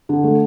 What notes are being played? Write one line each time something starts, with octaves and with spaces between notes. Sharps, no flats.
D3
A3